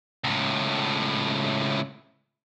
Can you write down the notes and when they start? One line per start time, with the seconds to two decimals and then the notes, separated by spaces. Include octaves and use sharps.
0.24 C#2 A2